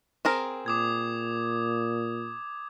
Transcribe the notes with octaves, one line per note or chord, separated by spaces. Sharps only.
C4 G#4 A#4
A#2 D6 D#6 G#6